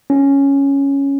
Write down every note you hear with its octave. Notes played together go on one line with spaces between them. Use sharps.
C#4